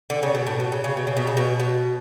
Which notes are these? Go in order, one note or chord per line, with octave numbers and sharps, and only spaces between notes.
D3
C#3
B2
A2
B2
C#3
C#3
B2
C#3
B2
C#3
B2
B2